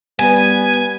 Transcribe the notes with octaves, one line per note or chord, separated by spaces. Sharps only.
G3 B3 G#5